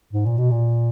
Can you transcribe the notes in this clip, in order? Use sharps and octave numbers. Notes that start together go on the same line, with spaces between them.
G#2
A#2
B2
A#2